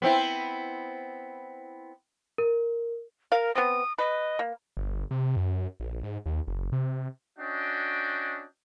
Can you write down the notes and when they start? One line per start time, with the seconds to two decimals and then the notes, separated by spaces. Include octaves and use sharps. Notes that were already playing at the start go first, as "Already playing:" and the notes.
0.02 B3 C4 E4
2.38 A#4
3.32 A#4 F5
3.55 B3 C4 D#6
3.98 B4 D#5
4.39 A#3
4.77 G1
5.11 C3
5.36 F#2
5.80 A#1
6.03 G#2
6.26 D#2
6.48 F#1
6.72 C3
7.38 C#4 D4 F#4 D#5 G5